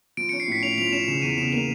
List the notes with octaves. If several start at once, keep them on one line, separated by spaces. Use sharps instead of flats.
F3 D7
C#4 C#7
C7
A2 B6
C#4 F7
F3 F7
C#4 E7
C#3 E7
E2 D#7
C#3 E7
A#3 F7